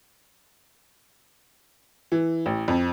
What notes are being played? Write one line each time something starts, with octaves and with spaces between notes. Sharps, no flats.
E3
A1
F2